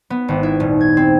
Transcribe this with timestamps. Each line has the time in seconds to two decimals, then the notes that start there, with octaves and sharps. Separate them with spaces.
0.10 B3
0.28 G#1
0.43 E4
0.60 D#1
0.81 G#6
0.97 C4